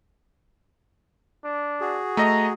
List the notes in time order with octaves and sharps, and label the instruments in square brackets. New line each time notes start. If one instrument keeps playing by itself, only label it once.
[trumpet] D4
[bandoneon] F#4 G#4
[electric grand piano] A3 D#5 D#6 [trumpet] A#5